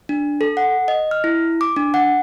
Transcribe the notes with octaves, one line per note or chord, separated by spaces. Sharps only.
D4
A4
F#5
D#5
F6
E4
D6
D4
F#5